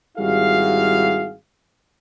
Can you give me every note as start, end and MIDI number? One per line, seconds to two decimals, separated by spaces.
0.18 1.32 32
0.18 1.32 55
0.18 1.32 64
0.18 1.32 66
0.18 1.32 68
0.18 1.32 77